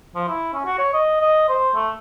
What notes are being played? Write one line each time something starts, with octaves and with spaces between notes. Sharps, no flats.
F3
E4
C#4
F#4
C#5
D#5
D#5
C5
A3